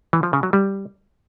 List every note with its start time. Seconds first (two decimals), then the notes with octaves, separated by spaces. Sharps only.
0.13 E3
0.23 F3
0.33 C#3
0.43 F#3
0.53 G3